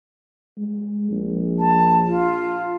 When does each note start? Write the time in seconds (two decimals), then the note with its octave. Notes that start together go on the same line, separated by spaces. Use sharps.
0.58 G#3
1.11 A#1
1.59 A5
2.08 F4